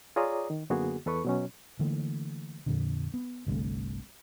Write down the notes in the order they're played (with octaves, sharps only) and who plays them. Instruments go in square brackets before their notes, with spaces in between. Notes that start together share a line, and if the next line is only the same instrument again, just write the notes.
[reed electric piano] F4 G#4 C#5 D5 A#5 D#6
D#3
F#2 D3 A#3 B3 F#4 G#4
E2 A4 B4 C#6
B2 F#3 C#4
[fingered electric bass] D3 E3 A3 A#3
F2 A#2 D3
B3
G1 C2 D3 A3